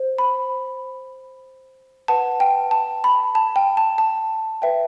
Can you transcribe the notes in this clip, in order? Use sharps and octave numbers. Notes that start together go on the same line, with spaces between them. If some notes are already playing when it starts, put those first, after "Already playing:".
Already playing: C5
B5
B4 F#5 A5
G5
A5
B5
A5
G5
A5
A5
B4 E5 G5